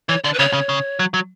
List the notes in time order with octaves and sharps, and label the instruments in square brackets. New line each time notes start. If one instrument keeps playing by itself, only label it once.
[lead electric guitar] E3 [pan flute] C#5
[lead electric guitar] D3 [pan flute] D5
[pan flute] B4
[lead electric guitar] C#3 [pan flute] C#5
[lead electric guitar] C#3
C#3
F#3
F#3